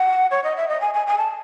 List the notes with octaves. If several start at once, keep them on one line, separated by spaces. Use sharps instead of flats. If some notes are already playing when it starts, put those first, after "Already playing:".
Already playing: F#5
C#5
D#5
E5
D#5
G#5
G#5
G#5
A5